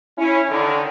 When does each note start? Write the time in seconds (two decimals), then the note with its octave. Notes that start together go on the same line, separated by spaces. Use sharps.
0.18 C#4 E4
0.49 D3 D#3